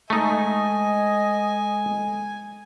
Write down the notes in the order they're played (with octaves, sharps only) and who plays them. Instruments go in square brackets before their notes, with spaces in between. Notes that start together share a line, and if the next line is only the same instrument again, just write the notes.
[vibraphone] G#3 A4 [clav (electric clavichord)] A3 D#4 [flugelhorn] D#5 [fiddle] G#5